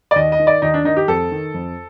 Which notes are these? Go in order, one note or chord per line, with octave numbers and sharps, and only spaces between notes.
D5
D#2 D#5
D#5
D#3
D5
D#2 D#4
D4
D#3 D#4
G4
F2 A4
D#3
F2